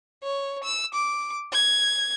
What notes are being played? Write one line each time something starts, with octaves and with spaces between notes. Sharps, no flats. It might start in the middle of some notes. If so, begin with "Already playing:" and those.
C#5
E6
D6
G#6